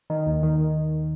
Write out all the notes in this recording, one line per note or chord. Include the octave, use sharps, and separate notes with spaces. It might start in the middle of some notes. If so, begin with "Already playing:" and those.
D#3
D#2
D#3